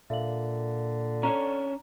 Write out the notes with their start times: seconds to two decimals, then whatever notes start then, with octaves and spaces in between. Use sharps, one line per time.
0.10 A#2 D3 E5 F5 F#7
1.23 C#4 D4 C#5 A#5